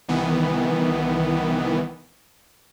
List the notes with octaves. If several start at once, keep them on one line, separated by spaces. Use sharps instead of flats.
C2 D#3 E3 B3